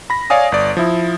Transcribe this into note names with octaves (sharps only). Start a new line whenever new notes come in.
B5 A#6
C#5 D5 F5 G#5 D#6
G1 D5
F3 E4